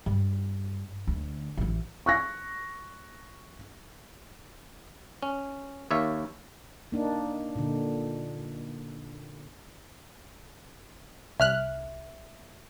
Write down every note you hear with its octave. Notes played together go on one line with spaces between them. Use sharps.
G2
D2
A1 E3
C#6 F#6 A#6
C#4
D#2 C#5 E5 F5
A#3 D4 D#4
A#2 D3
C2 E5 F6 F#6